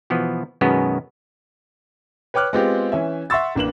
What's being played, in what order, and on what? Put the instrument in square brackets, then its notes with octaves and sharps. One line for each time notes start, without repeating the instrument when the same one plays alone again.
[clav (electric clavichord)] B2 E3 F3 B3
F#2 B2 D#3 G#3 B3 C#4
[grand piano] B4 C#5 G5 D6 F6 F#6
G#3 B3 C4 F4 G4
E3 C#4 E5
E5 F#5 C6 C#6 E6 A6
A1 A#3 D4 B4 E7 F#7